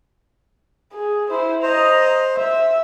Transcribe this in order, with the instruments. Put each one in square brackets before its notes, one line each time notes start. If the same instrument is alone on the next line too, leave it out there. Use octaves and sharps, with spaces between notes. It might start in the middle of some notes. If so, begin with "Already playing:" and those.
[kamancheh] G#4
E4 C5
[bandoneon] C5 [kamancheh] D#5 A#5
[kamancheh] E5